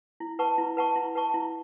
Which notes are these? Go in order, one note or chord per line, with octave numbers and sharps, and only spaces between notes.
E4
B4 F#5 A5 C#6
E4
B4 F#5 A5 C#6
E4
B4 F#5 A5 C#6
E4